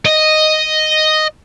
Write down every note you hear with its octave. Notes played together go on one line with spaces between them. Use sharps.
D#5